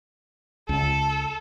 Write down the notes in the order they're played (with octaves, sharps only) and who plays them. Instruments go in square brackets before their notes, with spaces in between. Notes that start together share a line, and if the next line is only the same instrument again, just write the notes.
[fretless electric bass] C#2 [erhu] A4